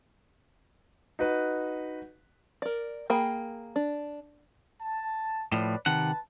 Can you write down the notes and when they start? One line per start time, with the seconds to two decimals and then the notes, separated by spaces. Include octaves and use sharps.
1.19 D#4 F#4 B4
2.62 A#4 D5
3.10 A#3 G#4 G5 B5
3.76 D4
4.81 A5
5.52 A2 F3 B4 C#5 D5
5.86 C3 D#3 B4 F#5 A5